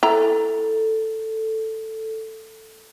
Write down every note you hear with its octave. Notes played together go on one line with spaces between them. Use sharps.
E4 A4 A#5